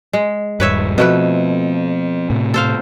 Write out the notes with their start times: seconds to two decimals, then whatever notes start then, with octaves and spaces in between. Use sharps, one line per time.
0.13 G#3
0.60 D#1 G2 B4 C#5 E5
0.98 B2 F3 A3 C4 B4
2.30 A2 C3
2.54 A4 C5 F5